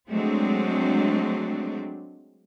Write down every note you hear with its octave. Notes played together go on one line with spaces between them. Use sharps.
F#3 G#3 A3 C4 D4